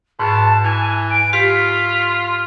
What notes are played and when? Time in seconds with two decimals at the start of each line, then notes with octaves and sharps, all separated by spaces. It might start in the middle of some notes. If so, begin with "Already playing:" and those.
0.20 G#2 B2 A5
0.64 E3 G#5
1.10 D7
1.33 F4 G4 B6